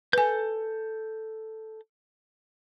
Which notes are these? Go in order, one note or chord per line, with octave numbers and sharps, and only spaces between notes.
A4 B4 G#5 G6